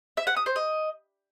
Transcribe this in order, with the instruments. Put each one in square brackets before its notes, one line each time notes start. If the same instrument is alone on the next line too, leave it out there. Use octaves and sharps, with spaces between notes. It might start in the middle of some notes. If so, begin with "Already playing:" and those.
[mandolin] E5
F#5
D#6
C5
D#5